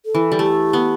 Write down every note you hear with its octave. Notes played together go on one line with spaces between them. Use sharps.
A4
E3
G3
A3 G4
B3